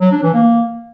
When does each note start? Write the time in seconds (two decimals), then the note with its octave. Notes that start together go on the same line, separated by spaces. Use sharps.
0.01 F#3
0.12 D4
0.23 E3
0.34 A#3